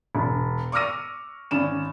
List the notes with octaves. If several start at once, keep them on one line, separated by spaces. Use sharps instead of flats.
E1
C#6 D6 E6 F6 A#6 D#7
G#1 C#4 E7